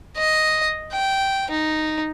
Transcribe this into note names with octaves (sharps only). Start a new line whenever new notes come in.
D#5
G5
D#4